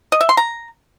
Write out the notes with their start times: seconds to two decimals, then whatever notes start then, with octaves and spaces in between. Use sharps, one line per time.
0.12 D#5
0.21 E5
0.29 C6
0.37 A#5